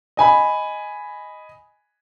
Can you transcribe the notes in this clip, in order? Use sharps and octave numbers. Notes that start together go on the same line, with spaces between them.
D#5 G#5 B5